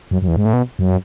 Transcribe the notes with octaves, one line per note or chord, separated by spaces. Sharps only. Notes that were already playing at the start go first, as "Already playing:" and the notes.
F#2
F#2
E2
G#2
A2
B2
F#2